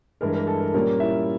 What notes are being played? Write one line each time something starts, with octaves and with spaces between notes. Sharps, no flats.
G2 E3 G#3 A#4
A#4
A4
A#4
A#2 G3 A#3 C#4 A#4
E4 E5